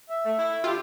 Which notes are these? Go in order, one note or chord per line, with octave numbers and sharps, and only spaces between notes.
E5
A3
E4
D3 E4 F4 G4